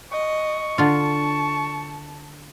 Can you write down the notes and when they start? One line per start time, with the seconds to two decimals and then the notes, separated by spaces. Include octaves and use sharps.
0.12 D#5 C#6
0.78 D3 F4 A5